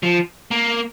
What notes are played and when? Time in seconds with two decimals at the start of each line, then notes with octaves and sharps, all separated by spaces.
0.03 F3
0.51 A#3